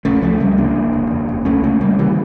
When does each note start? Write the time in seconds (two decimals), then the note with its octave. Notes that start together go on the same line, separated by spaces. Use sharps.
0.05 C#2 A3 C#4
0.22 C#2 F3 A3
0.40 C#2 G3 A#3
0.57 C#3 A#3 D4
0.76 E1
0.93 E1
1.10 E2
1.29 E1
1.45 C#2 A3 C#4
1.63 C#3 A3 C#4
1.81 C#3 G3 A#3
1.98 C#3 E3 G3